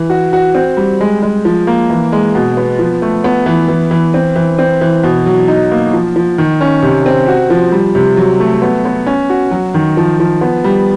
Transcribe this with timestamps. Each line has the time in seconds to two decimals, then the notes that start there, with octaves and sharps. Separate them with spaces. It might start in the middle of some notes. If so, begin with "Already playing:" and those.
Already playing: E3
0.10 F#4
0.33 F#4
0.54 C4
0.77 G3
1.01 G#3
1.23 G#3
1.45 F3
1.67 A#3
1.90 E3
2.12 G#3
2.35 B2
2.57 B3
2.79 F3
3.02 A3
3.24 B3
3.46 E3
3.69 E3
3.91 E3
4.14 C4
4.36 E3
4.58 C4
4.81 E3
5.03 B2
5.26 F#3
5.48 D#4
5.71 A#3
5.93 F3
6.16 F3
6.38 D#3
6.61 C#4
6.82 C3
7.06 C4
7.28 F#4
7.50 F3
7.72 G3
7.95 C3
8.17 F#3
8.40 A3
8.62 B3
8.85 B3
9.06 C#4
9.30 F#4
9.51 F#3
9.74 D#3
9.97 F3
10.20 F3
10.41 B3
10.64 G3